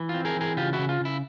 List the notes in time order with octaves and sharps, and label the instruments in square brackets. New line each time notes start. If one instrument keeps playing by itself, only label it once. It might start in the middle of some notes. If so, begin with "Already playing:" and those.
Already playing: [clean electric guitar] E3
C4 F4
G#4 A#4
E3 G#4 A#4
C#3 F4 G4
E4 F#4
C#3
F4
C#3 E4